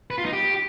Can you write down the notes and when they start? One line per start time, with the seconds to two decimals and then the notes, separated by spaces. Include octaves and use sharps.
0.10 B4
0.18 F4
0.25 D#4
0.33 G4